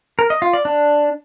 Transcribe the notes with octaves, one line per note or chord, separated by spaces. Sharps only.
A#4
D#5
F4
D5
D4